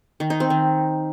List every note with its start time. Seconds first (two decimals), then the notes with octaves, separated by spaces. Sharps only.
0.20 D#3
0.30 D#4
0.40 C4
0.50 D#3